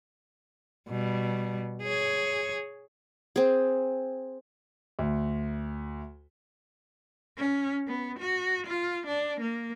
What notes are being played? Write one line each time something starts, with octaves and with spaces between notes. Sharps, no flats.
B2 G3
G#4 C#5
C4 G#4
D2
C#4
B3
F#4
F4
D4
A#3